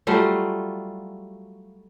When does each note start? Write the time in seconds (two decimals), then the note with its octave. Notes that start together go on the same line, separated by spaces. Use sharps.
0.07 F#3 G3 A3 F4